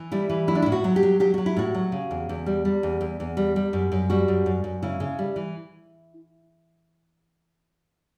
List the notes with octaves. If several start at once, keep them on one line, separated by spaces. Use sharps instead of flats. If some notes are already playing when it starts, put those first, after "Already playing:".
Already playing: E3
G3 E4
E3
F#3 E4
D4
A2 E4
F#4
F#3
G4
F#3
F#3 G4
F#3 F#4
E4
A2 F#4
F#3
C#3
E2
E2
G3
G3
E2
E2
E2
G3
G3
F#2
F#2
G3 F#4
F#2
F#2
F#2
C#3 E4
C#3
G3
E3